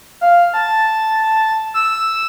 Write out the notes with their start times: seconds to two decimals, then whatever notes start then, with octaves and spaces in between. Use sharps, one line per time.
0.21 F5
0.54 A5
1.74 E6